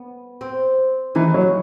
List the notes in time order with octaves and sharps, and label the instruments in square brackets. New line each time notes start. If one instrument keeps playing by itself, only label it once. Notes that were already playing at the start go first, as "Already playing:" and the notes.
Already playing: [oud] B3
C4
[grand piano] E3 [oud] D#4
[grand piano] F#3